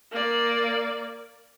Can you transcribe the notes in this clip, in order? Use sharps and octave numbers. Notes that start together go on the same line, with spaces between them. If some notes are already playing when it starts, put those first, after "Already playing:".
A#3 D5